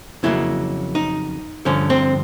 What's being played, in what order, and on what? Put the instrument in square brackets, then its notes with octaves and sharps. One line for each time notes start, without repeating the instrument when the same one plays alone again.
[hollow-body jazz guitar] F2 C#3 F#3 A#3 E4
D#4
G2 D3 F3 C#4
C4